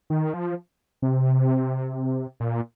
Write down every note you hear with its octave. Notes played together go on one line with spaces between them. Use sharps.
D#3
F3
C3
A#2